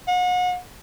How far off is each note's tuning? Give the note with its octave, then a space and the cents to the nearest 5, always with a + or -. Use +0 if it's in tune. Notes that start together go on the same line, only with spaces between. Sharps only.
F#5 -35